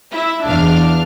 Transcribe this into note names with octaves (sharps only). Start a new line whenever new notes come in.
E4 E5
E2 D4 F5 F6